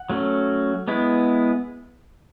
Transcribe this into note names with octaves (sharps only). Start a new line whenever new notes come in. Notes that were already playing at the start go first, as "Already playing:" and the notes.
Already playing: F#5
F#3 A3 C#4
G#3 B3 E4